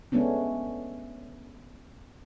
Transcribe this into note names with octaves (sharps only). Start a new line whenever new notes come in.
G#3 A3 B3 C#4 D4